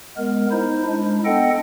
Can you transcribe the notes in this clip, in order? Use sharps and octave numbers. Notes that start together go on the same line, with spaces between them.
G#3 B3 A#4
D#4 E4 C5
G#3 D4 E4
B3 D4 A4 D#5 F#5 G5